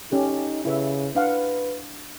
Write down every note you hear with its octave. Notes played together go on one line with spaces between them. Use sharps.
C#4 D#4 G4 A4
C#3 E4 B4 E5
D4 B4 F5 F#5